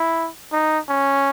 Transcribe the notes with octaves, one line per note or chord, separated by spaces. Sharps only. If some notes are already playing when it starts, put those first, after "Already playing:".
Already playing: E4
D#4
C#4